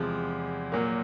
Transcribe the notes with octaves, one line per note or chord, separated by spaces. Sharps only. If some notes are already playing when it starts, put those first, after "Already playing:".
Already playing: E2 C3 F3 G#3
A#2 F#3 A#3